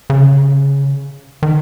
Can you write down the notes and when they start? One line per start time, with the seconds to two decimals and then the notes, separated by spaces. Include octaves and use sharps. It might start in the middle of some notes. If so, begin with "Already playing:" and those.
0.10 C#3
1.43 D#3